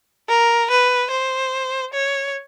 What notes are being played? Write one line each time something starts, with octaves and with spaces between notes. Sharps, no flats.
A#4
B4
C5
C#5